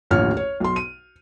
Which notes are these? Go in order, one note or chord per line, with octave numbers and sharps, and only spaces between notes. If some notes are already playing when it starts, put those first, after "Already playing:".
A1 D#2 D3 F3 C#5 F6
C#5
B1 C6
D#7